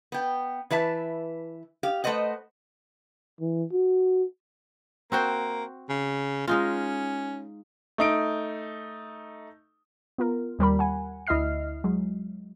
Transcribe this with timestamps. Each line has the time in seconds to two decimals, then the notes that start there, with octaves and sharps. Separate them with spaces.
0.12 B3 G5
0.70 E3 B4 E5 A5
1.83 G4 F5
2.04 A3 B4 C5 D#5 F#5
3.41 E3
3.72 F#4
5.12 A#3 C4 F#4 C5
5.89 C#3
6.47 G#3 C#4 D#4 F4
7.98 A3 D#4 D7
10.18 B3 F4 A#4
10.59 D#2 G3 A#4 B5
10.79 F#5 G#5
11.27 D2 E4 D#5 E5 F6 C7
11.84 F#3 G#3